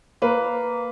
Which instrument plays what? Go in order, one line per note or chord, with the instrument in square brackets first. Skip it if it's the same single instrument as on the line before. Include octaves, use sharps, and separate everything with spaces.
[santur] A#3 [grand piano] B4